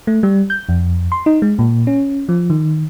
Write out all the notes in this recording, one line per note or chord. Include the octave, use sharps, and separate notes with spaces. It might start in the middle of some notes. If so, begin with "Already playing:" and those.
A3
G3
G6
F2
C6
D#4
G#3
A#2
C#4
F3
D#3